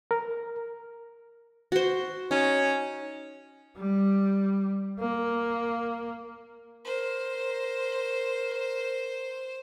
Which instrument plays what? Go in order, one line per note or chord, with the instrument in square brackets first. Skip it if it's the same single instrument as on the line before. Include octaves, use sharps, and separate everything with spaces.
[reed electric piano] A#4
[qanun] F#4 C5
[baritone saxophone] C#4 [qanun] D#4
[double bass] G3
A#3
[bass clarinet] A#4 [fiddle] C5